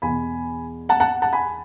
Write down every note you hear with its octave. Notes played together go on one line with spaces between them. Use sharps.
E2 B2 G#5 B5
F#5 A5
F#5 A5
F#5 A5
G#5 B5